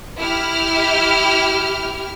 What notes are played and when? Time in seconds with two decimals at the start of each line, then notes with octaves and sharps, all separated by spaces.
0.18 E4 G4 F6